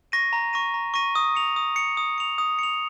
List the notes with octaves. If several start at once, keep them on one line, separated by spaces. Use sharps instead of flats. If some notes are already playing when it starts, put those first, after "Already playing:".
C#6 A#6 D#7
A#5
C#6 A#6 D#7
A#5
C#6 A#6 D#7
D#6
C#7 F7
D#6
C#7 F7
D#6
C#7 F7
D#6
C#7 F7